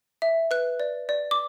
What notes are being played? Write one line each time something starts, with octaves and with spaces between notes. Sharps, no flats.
E5
B4 F#6
D5
D5
D6